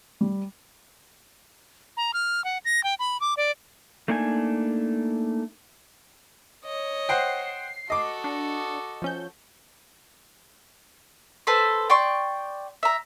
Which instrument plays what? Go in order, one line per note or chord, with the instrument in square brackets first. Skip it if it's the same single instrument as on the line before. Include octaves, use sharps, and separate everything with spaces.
[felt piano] G3
[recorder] A#5
F6
F#5
A#6
G5
B5
D6
D5
[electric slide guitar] A3 A#3 D4 D#4 F#5 G#5
[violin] C#5 D#5
[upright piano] C5 F#5 G5 [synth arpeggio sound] C7
[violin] F#4 A4 [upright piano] D#5 D6
[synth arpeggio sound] D4
F3 C#4 G6
[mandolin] A4 B4 C5 C6
D5 G5 C6 C#6
E5 A#5